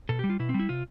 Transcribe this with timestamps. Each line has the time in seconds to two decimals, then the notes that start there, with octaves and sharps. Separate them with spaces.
0.09 B2 A4
0.19 G4
0.24 G3
0.30 F4
0.39 B2 E4
0.49 C4
0.54 G3
0.59 E4
0.69 C3 F4